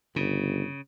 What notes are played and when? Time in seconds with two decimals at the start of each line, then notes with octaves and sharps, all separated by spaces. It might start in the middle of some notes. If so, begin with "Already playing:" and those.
0.16 G1 C#3